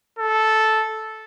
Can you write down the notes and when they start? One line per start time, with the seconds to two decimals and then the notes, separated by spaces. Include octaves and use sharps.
0.19 A4